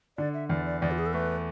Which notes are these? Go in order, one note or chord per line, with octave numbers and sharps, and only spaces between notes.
D3 D5
E5
E2 D5
D5
E2 D5
F4
G#4
A4
A3 B4